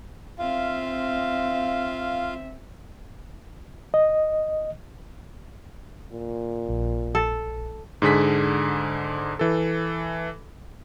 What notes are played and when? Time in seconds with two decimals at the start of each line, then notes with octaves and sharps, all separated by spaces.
0.39 C4 F4 E5 F5
3.94 D#5
6.12 A#2
6.69 A#1
7.15 A4
8.02 G#2 D3 G#4 B6
9.39 E3 A4